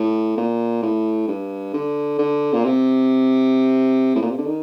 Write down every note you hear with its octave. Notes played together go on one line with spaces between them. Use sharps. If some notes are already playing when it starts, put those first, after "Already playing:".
Already playing: A2
A#2
A2
G2
D3
D3
A#2
C3
A2
A#2
C3
D3
D#3